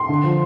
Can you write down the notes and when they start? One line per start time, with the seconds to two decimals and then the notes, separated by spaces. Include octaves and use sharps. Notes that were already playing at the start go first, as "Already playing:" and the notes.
Already playing: C6
0.09 D3
0.24 F3